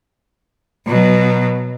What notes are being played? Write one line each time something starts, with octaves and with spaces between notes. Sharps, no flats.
B2 F#3